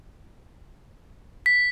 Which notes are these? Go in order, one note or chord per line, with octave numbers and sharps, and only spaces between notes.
B6